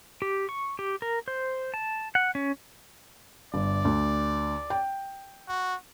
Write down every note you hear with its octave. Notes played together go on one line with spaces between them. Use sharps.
G4
C#6
G4
A#4
C5
A5
F#5
C#4
G1 D5
D2
G5
F#4